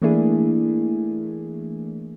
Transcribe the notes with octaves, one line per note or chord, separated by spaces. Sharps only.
E3 A3 A#3 D4 E4 G#4